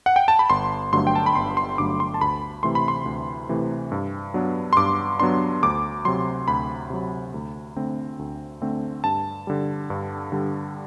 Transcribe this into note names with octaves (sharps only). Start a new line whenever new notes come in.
F#5
G5
A5
B5
G1 C6
G2 D3 F#3 A3 C6
G5
A5
B5
G1 C6
C6
G2 D3 F#3 A3 D6
C6
A5
D2 B5
C3 E3 A3 C6
B5
C6
D2
C3 E3 A3
G2
F#3 B3 D4
C6
G2 D6
F#3 B3 D4 C6
D2 D6
C3 F#3 C6
D2 B5
C3 F#3
D2
D3 A3 C4
D2
D3 A3 C4
G2 A5
D3 G3
G2
D3 G3